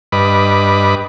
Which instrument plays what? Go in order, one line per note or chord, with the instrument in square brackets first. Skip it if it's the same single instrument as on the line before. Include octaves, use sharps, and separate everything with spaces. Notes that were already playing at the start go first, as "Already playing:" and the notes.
[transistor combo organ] G2 B4 D#5 B5 D6